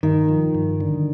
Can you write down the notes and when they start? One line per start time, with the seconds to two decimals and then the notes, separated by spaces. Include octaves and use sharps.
0.03 G2 D#3
0.29 F3
0.55 G2
0.80 D3